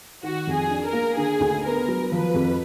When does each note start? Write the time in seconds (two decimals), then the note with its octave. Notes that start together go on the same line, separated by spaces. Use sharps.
0.23 D#3 F#4
0.47 F2
0.55 G#4
0.71 D4
0.86 A#4
0.93 A#3
1.17 D3 G#4
1.40 D2
1.64 B3 A#4
1.88 F#3
2.11 F3 B4
2.34 F2